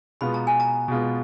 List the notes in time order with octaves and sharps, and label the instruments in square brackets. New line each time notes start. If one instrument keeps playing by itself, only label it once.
[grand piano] B2 G#3 B3 F4 [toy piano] B5
[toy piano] A#5
G#5
A#5
[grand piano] B2 G#3 B3 F4